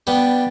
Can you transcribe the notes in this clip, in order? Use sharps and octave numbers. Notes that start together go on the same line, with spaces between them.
G3 B3 D4